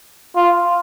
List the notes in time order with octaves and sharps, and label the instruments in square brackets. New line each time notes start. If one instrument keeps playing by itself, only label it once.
[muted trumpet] F4